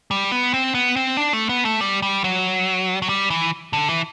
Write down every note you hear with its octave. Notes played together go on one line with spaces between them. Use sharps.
G3
B3
C4
B3
C4
D4
A3
B3
A3
G3
G3
F#3
F#3
G3
E3
D3
E3